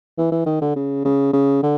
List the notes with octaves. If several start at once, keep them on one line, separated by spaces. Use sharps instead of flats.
E3
E3
D#3
D3
C#3
C#3
C#3
D3